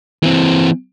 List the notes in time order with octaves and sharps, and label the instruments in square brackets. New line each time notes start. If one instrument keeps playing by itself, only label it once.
[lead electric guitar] E3 C4